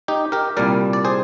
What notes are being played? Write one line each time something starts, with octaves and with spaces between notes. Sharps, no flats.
D#4 G4
G4 A#4
C2 A#2 G3 A#4 D5
D5
G#4 C5